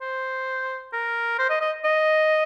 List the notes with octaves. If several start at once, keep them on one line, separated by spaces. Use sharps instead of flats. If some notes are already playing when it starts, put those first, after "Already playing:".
C5
A#4
C5
D#5
D#5
D#5